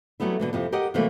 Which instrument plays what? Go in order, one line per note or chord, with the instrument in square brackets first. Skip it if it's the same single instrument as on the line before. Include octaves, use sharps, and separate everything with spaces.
[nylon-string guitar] F#3 G3 A3 B3 E4
B2 D3 E3
F2 C3 F3 G4
G4 A#4 D#5 F#5 G5
C3 E3 F#3 G3 A3 A#3